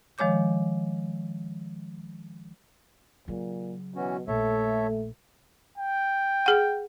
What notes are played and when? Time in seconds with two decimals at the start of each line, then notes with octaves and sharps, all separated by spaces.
0.18 D#3 F3 G#3 C#5 D6 G6
3.28 A#2 C#3 F#3
3.96 B2 E3 C#4 F#4
4.28 A#1 A3 A4 C#5 E5
5.78 G5
6.46 G#4 F#5